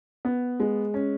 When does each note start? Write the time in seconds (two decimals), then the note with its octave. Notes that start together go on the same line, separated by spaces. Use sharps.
0.25 B3
0.60 G#3
0.94 C#4